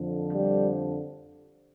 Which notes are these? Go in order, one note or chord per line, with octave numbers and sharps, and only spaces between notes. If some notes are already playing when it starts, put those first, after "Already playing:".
Already playing: F2 D3 F3
G3